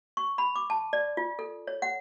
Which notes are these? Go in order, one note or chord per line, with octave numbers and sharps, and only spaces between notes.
C#6
B5
D6
A5
D5
F4
A4
C#5
F#5